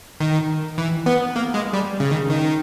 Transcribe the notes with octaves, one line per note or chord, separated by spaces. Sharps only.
D#3
E3
B3
A#3
G#3
G3
C#3
D#3
D#3